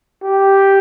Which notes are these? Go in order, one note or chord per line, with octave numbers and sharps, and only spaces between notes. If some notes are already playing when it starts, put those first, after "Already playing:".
G4